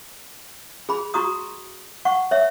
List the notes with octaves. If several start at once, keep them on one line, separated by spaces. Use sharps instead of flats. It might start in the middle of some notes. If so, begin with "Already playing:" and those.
G#4 B5
F#4 A#5 C#6 D#6
F#5 C#6
C#5 E5